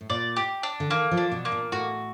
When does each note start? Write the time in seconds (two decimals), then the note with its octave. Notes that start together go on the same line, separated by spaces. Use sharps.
0.01 A2
0.10 A#2 D5
0.36 G4
0.63 D4
0.80 D3
0.91 D#3 A#3
1.11 F3
1.17 D4
1.32 B2
1.45 A#3
1.52 A#2
1.72 A2 F#4